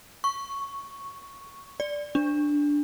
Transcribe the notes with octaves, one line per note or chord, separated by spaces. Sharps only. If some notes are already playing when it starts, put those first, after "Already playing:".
C#6
D5
D4